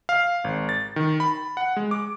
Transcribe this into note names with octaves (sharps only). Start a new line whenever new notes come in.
F5
G#1
A6
D#3
B5
F#5
G#3
D6